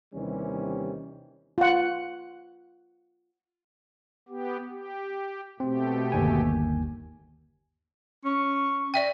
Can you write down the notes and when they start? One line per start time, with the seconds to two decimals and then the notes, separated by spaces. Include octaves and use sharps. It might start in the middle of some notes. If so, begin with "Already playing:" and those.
0.13 D#2 C3 D#3 E3 G3 C#4
1.58 F4 F#5
4.29 B3 G4
4.71 G4
5.60 B2 A3 C4 G4
6.12 G1 D#2 G#5
8.25 C#4 C#6
8.94 D5 E5 G5